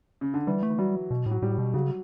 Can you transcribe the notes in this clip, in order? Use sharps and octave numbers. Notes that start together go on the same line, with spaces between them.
C#3
D3
E3 G3
A3
E3
F#3 G3
B2
A2
F#3
A2 G3
B2
C#3 F#3